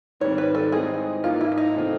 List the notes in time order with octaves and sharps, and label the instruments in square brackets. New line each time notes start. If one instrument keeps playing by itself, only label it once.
[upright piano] G#2 D#3 G3 C4 [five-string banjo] C#5
[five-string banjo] B4
A4
[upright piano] E3 G#3 C4 D#4 [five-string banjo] G#4
[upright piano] A1 G#2 F3 A#3 [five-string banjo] F4
[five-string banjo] E4
E4
D#4
[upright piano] C3 E3 A3 C4 F4